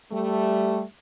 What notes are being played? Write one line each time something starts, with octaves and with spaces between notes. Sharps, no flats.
G3 A3